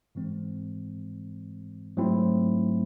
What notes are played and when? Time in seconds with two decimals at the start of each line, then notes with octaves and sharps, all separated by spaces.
0.15 G#2 E3 G#3 C4
1.97 G#2 F#3 A3 C4 E4